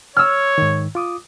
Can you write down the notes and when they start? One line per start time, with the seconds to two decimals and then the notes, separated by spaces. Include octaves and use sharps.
0.16 C#5 E6 F6
0.58 G#2 D#3
0.95 F4 D6 D#6